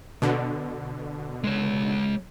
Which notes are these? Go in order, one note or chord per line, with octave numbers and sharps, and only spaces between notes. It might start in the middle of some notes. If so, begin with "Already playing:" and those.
B2 D3
G#3 C#5